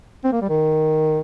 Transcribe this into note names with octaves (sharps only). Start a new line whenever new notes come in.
C4
A#3
G3
D#3